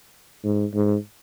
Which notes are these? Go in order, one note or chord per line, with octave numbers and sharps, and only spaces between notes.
G#2
G#2